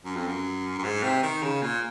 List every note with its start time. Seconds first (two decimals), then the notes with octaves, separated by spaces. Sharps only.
0.05 F#2
0.16 F2
0.27 F#2
0.79 F#2
0.84 G#2
1.03 C3
1.23 D#3
1.43 C#3
1.62 A#2